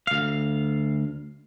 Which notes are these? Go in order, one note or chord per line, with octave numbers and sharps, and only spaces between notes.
D2 F5